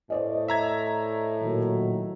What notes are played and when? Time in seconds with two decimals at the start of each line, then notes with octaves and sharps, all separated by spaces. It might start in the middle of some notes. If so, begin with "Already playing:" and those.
0.10 A2 C5 D5 D#5
0.48 E5 A#5 G#6
1.42 A#2 D#3 F#3